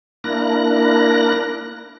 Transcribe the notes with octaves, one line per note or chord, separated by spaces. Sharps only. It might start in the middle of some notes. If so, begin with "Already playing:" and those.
A#3 D4 E4 A#4 F#6 A#6